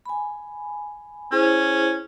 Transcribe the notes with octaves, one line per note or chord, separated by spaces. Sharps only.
G#5 B5
C#4 E4 G#4 C5